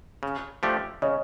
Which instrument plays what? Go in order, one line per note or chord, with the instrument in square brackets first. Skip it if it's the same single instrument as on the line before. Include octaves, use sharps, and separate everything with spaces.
[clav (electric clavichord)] C#3
F3 A3 D4 G4
[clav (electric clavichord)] C#3 [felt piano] C#5 D#5